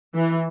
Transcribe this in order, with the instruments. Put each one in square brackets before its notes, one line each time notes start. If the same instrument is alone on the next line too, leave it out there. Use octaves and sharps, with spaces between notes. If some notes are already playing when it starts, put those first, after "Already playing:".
[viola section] E3